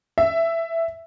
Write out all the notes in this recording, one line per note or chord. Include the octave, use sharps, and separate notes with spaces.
E5